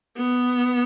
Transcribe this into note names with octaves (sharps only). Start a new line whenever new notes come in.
B3